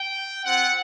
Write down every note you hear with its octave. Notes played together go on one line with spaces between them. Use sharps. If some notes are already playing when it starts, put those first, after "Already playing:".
Already playing: G5
C4 F4 F#5